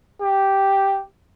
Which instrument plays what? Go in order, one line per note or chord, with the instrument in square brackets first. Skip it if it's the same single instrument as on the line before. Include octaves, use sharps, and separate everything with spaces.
[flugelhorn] G4